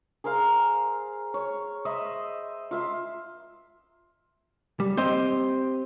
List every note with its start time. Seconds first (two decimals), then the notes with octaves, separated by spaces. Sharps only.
0.24 G#4 A#4 C5 F5
1.34 C#5
1.85 C5 D#5 E5 B5
2.71 F4 E5 C6
4.80 G3
4.97 C4 G4 C5 D#5